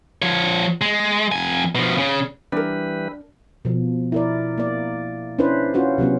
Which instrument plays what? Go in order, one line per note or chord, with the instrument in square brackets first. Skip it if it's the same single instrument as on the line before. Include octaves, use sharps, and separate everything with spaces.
[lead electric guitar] F3 C#5
G#3
F2 G#5
B2 F3
C#3
[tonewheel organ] E3 G3 B4 [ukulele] D4 A#4
[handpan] B2 F3
E4 A#4 D5
A#3 D5
C#4 D4 E4 B4 C5
C#4 F4 F#4 C5
C3 F#3 B3 C#4